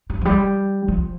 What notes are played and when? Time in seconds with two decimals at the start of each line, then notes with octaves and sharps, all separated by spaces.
0.10 G3
0.21 F3
0.25 G3
0.88 F3